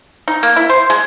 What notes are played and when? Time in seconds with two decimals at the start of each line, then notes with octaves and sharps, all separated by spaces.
0.28 D#4
0.43 A#3
0.56 E4
0.69 C5
0.90 G#3